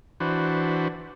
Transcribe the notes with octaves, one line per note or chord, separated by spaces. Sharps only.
E3 D4 F#4 B4 C5